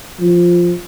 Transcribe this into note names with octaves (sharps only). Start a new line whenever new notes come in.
F3